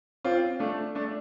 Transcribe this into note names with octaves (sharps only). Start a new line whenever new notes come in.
C4 F4
A3 D4
A3 D4